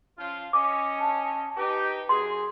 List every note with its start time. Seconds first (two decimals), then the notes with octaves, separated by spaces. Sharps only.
0.18 F3 C#4 F4
0.53 C#4 D#5 D6
0.99 A5
1.57 D#4 G4 B4
2.09 F#2 G#4 C6